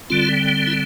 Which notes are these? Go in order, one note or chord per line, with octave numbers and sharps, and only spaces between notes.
D3 G3 C4 F4
E4